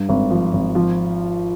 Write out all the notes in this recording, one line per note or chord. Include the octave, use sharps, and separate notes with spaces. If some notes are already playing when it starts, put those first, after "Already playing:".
Already playing: G2
G#1
F3
G#1
F3